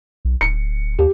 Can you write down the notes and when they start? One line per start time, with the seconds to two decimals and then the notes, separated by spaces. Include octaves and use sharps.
0.25 B1
0.41 D1 C#7
0.99 D#2 G4